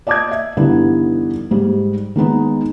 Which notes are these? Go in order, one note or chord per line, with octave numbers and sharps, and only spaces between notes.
D5 D#5 A5 D6 D#6 G#6
E5
G2 D3 E3 B3 D#4
G#2 G3
D#3 G#3 B3 D#4